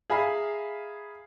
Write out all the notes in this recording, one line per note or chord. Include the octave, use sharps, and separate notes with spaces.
G#4 E5 F5 G#5 A#5 B5